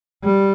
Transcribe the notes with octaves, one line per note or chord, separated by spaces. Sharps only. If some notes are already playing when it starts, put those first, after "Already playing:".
G3